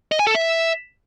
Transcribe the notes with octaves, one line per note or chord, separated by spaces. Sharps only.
D#5
G#5
A4
E5